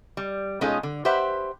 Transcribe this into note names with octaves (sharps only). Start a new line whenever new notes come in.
G3
B2 G#3 C#4 D#4 F4 A4
D3
G4 B4 C5 E5 F#5